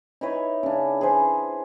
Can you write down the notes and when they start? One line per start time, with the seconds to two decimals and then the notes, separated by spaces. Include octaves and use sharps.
0.21 D#4 E4 B4 C#5
0.63 C#3 D4
1.01 G#4 B4 C5